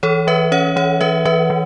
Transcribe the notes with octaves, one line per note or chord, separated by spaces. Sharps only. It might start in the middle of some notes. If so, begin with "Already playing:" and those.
E3 A4 C#5
E3 B4 E5
C#4 C#5 F#5
E3 C#5 F#5
E3 B4 E5
E3 B4 E5
E3